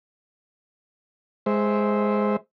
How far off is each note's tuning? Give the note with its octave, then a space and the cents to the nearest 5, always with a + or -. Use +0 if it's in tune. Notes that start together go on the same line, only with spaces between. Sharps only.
G#3 +0 C5 +0 E5 -15